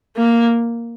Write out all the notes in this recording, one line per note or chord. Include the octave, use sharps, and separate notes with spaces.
A#3